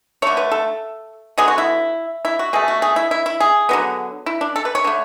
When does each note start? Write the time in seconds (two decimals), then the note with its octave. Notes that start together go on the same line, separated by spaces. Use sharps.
0.22 D3 A3 C#5
0.37 B4
0.52 A4
1.38 D3 F#3 B3 G#4
1.48 F#4
1.58 E4
2.25 E4
2.39 F#4
2.53 B2 A3 G#4
2.68 F#4
2.82 G#4
2.96 E4
3.11 E4
3.26 E4
3.40 G#4
3.69 D3 F#3 B3
4.26 E4
4.41 D4
4.56 A4
4.65 B4
4.75 C#5
4.84 D3 A3